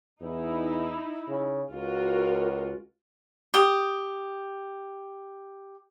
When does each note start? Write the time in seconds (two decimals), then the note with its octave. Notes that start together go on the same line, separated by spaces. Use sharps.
0.21 E2 D#4 E4
1.29 C#3
1.72 C#2 F4 F#4 A#4
3.54 G4 D#6